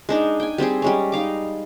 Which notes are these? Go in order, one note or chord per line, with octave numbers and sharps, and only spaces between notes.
G#3 D4 D#4
G5 G#5
G3 C4 G4 G#4
G3 G#3 C#4
D#4 F5 D6